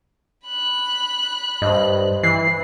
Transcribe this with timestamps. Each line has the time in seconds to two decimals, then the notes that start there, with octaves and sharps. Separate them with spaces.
0.47 B5 F#6
1.62 G2 C5 D#5
2.23 E3 C7